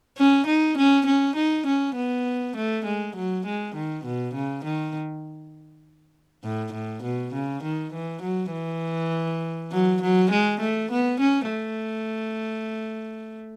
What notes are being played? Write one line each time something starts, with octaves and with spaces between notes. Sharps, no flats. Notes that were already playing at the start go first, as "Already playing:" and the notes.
C#4
D#4
C#4
C#4
D#4
C#4
B3
A3
G#3
F#3
G#3
D#3
B2
C#3
D#3
A2
A2
B2
C#3
D#3
E3
F#3
E3
F#3
F#3
G#3
A3
B3
C#4
A3